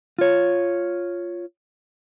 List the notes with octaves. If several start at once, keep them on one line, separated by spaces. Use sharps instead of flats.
F4 C#5